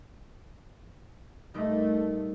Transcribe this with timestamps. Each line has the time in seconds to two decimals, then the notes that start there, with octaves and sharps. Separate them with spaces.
1.54 A#2 G3 A3 D#4